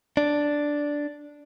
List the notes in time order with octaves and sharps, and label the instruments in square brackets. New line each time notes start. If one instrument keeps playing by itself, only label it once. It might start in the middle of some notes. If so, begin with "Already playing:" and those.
[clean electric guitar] D4